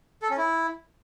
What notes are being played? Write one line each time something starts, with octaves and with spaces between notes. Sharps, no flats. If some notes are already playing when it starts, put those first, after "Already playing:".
A4
C#4
E4